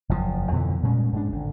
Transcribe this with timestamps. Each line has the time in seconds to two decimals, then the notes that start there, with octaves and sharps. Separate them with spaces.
0.09 F#1 E2 C3 F3
0.51 F2 B2 D3 E3
0.83 A#2 G3 G#3 C#4
1.13 G#2 G#3 D4
1.32 G#1 D3